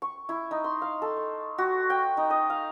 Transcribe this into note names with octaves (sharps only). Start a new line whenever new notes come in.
C#6
E4
D#4
C6
F5
A4
C#6
F#4
G5
D#4
D#5
F5